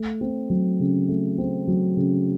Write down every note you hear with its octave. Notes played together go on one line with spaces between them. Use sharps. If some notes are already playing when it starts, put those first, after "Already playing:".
Already playing: A3
C4
F#3
C#3
A3
C4
F#3
C#3